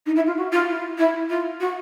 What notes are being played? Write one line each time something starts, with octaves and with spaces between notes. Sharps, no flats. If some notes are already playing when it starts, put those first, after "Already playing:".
D#4
E4
F4
F#4
F4
E4
E4
F4
F#4